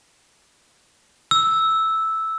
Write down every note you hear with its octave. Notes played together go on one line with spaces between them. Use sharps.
E6